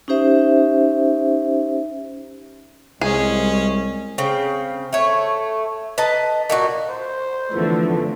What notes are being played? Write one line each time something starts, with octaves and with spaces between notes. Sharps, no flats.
C#4 D#4 G4 C5 E5
C2 G#3 C#4 G#4
C#3 C4
A3 C#5
B4 D#5 A5 A#5
A#2 D#4 F#4
C5
D3 E3 F3 A3 B3